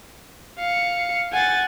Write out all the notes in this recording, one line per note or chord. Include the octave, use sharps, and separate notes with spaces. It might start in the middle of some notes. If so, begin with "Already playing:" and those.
F5 C#7
F#5 G#5 A6